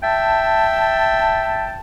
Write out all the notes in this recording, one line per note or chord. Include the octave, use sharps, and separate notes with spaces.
E5 G5 A5